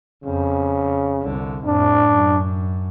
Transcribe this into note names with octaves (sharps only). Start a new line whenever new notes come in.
F2 C#3
C2 D3
F2 A2 D4
F#2